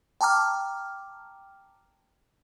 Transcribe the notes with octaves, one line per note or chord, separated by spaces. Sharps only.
G5 A5 A#5 D6 F6